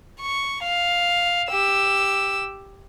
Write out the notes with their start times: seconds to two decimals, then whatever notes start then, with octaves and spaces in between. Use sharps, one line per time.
0.20 C#6
0.63 F5
1.50 G4 E6